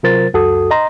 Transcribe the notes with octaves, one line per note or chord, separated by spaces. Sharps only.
C3 F#3 F4 A#4 C5 A6
C#2 F#2 F#4 A4 D#6
D#5 A#5 C6